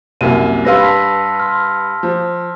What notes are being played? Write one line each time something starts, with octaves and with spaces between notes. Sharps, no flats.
C2 F#2 A#3 D#7
G2 B4 F5 C6 E6 A#6
A5 B6
C6 F6
F3